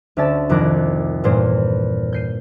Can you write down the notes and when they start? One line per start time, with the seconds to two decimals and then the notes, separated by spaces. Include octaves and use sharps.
0.17 D2 C#4 D5 E5 A5 A6
0.49 C2 F2 D#3 D6 F#6 A#6
1.24 E2 G2 A#2 C5
2.13 G6 C7 D#7